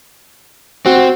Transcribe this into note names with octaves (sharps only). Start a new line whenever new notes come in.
C4 F#4